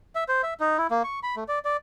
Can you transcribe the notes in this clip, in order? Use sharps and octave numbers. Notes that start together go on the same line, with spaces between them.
E5
C5
E5
D#4
E4
A#3
C#6
B5
A3
D5
D5